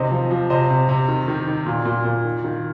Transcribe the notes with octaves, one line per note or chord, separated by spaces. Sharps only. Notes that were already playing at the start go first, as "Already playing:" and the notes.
Already playing: C3 D#3 C5 D#5
F3
F3
C3 C5 D#5
C3
C3
D#3
D#3
D#3
A#2
A#2
A#2
D#3
D#3